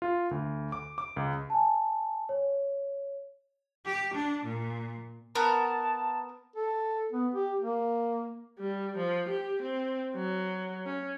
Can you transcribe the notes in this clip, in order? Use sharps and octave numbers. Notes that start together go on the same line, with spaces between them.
F4
D2
D6
D6
C#2
G#5 A5
C#5
G4
D4
A#2
B3 A#4 A5
A4
B3
G4
A#3
G3
F3
G4
C4
F#3
C#4